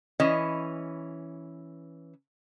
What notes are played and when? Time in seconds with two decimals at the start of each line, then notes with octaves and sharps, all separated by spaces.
0.20 E3 C#4 D#5